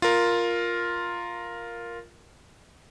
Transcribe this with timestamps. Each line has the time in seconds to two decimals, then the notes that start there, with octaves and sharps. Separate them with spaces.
0.02 F4 A#4